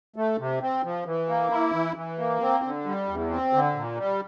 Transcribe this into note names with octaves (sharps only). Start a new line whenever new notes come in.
A3
C3
C4
F3
E3
A#3
E4
E3
E3
A#3
C4
D3
G3
E2
C4
D3
A#2
G3